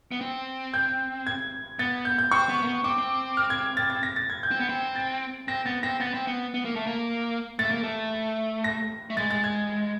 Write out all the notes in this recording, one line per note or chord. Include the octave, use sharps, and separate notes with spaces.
B3
C4
G6
G#6
B3 A6
G6
G6
C4 C#6
B3
A#3
B3
C4 D6
C4
F6
G#6
A6
A6
A#6
A6
G#6
G6
C4
B3
C4
A6
C4 A#6
B3 A6
C4 A#6
B3 A6
C4
B3
B3
A#3
A3
A#3
A3 A6
A#3
A3
A#6
A3
G#3 A6
A6
G#6